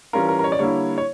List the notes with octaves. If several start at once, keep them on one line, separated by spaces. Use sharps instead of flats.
E3 G3 C#4 F4 A#4
A#4
A#4
C#5
D5
D3 G3 A#3 E4 C#5
C#5